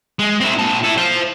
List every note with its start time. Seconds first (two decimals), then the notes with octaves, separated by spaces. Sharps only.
0.19 G#3
0.41 C4 E4
0.58 A#2 A5
0.84 E4 A4
0.98 C5 F5